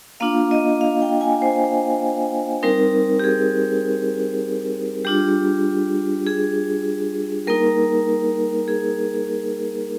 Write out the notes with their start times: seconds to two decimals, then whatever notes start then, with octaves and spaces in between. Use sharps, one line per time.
0.20 A#3 D4 F4 F5
0.51 D#5
0.81 F5
1.02 G5
1.21 G#5
1.42 C5
2.63 G3 C4 D#4 A#4
3.19 G4
3.24 G#4
5.05 G3 D4 F4 G4
6.26 G#4
7.47 G3 A#3 D#4 A#4
8.68 G#4